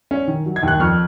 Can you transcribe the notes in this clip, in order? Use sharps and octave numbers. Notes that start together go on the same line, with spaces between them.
C#4
D#3
F#3
G#6
D#2 F#6
F2 C#6 F6